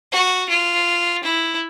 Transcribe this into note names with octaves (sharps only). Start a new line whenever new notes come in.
F#4
F4
E4